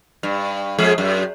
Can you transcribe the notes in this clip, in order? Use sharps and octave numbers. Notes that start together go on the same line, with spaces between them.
G2
F2 G#3 G#4
F#2